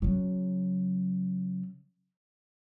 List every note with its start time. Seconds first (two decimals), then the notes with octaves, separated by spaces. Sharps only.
0.02 C#3 F#3